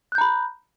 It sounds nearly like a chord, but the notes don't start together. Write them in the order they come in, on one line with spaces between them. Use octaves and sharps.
F#6 G6 A#5 B5